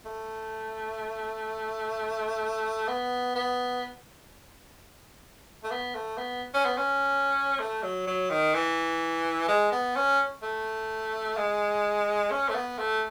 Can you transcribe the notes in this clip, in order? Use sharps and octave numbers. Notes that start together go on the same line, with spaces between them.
A3
B3
B3
A3
B3
A3
B3
C#4
B3
C#4
A3
F#3
F#3
D#3
E3
G#3
B3
C#4
A3
G#3
C#4
A3
B3
A3